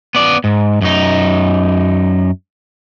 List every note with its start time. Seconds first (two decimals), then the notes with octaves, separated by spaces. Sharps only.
0.15 B3 D5
0.44 G#2
0.81 F#2 D#4